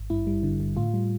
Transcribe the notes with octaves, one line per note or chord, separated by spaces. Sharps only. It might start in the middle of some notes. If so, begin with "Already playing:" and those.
Already playing: G#1
G2 E4
G3
D3
D3
A2 F4
G3